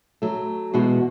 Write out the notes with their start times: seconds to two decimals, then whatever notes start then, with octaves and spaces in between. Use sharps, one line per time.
0.22 F#3 A3
0.73 E2 B2 G#3 B3 F#4